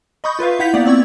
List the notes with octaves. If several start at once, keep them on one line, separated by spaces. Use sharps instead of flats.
D#5 B5 C#6 D#6 G6
F4 B4 E5 F5
E4 F5 F#5 G6 B6 F7
A#3 B3 D5 F#5
C4 D5 C#6 E6 G#6